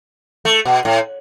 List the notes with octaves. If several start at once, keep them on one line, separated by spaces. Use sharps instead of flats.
A3
B2
A2